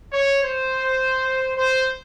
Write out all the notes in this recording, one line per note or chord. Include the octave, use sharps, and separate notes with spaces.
C#5
C5
C5